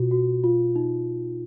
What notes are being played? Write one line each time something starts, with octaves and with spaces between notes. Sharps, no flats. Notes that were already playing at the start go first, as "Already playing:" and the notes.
Already playing: B2 F4 F#4
F#4
F4
D#4